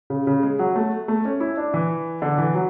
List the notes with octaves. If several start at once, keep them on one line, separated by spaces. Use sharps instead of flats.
C#3
C#3
G#3
F#3
A3
A3
C#4
E4
D4
E3
D3
E3
F#3